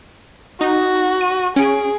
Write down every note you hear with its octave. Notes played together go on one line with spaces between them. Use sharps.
D#4 F#4
D#7
C#4 G#4 D7